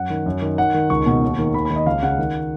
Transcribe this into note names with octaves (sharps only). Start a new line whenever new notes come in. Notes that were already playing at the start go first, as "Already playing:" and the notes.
Already playing: F#2 F#5
D#3
F#2
D#3
D#3 F#5
D#3
C#2 C#6
B2
D#2
D#3
D#2 B5
B5
D#3
D#5
C#2 F5
C#3 F#5
D#3